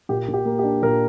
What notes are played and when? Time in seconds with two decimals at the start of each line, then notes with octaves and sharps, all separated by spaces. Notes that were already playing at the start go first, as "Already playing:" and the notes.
0.09 A#2 G4
0.28 A#2
0.33 G4
0.45 A#3
0.59 G4
0.64 D4
0.82 A#2 A#4